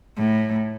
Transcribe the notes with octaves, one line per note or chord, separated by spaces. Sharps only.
A2